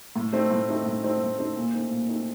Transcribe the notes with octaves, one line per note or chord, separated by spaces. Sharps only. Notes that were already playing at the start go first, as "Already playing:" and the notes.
A2
A3 C4 D#4
A2
A3 C4 D#4
A2
A3 C4 D#4
A2
A3 C4 D#4
A#2
A3 C4 D#4
A#2
A3 C4 D#4